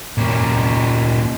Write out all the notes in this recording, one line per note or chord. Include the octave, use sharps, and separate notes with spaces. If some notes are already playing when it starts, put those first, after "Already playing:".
A#2 C#4